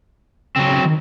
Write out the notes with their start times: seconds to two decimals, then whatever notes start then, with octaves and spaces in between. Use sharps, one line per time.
0.56 C#3 F#3 C4
0.85 D#3